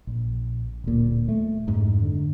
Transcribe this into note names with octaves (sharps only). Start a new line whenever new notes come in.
A#1
D1 A#2
A3
F2 G#2
D3